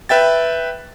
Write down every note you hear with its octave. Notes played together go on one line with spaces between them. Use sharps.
B4 E5 G5 A6